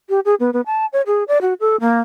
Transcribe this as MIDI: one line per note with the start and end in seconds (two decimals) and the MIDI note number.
0.09 0.20 67
0.25 0.35 68
0.40 0.50 59
0.53 0.61 59
0.66 0.86 81
0.93 1.01 73
1.06 1.23 68
1.28 1.38 74
1.41 1.53 66
1.60 1.76 69
1.80 2.00 58